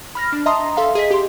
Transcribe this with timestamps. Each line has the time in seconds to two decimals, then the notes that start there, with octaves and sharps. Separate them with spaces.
0.15 B5 F6 A#6
0.33 D4
0.46 D#5 E5 A5 A#5 C6 D#6
0.77 A4 E5 F5 C6
0.95 G#4 D#5 B6
1.11 G4 C6